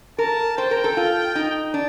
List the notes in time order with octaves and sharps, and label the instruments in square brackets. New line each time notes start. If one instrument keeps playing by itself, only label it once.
[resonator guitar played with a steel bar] A#4 [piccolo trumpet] A5
[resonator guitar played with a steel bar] C5 [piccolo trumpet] G5
[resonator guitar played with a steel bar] A#4
A4
F4
D#4
D4